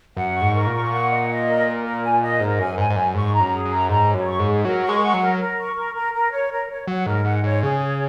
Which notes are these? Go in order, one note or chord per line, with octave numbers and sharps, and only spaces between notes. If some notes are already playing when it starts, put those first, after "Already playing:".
F#2 F#5
C#6
G#2
A#4
A#2
C#6
F#5
D#5
D#5
A#4
A#4
A#4
G#5
D#5
G#2 A#4
F#2 G#5
G#2 G#5
G#2
F#2 G#5
G#2 C#6
A#5
F#2
G#4
F#2
A#5
G#2 A#5
C#5
F#2
C#6
G#2
G#4
F#3 A#4
C#6
G#3
F#5
F#3
A#4
A#4
C#6
A#4
A#4
A#4
C#5
A#4
C#5
F#3 F#5
G#2 A#4
G#2 F#5
G#2 C#5
C#3 G#4
C#5